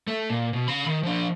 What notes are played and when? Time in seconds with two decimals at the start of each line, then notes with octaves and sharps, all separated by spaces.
0.07 A3
0.30 A#2
0.53 B2
0.68 C#3 B5
0.86 D#3
1.03 F3 D4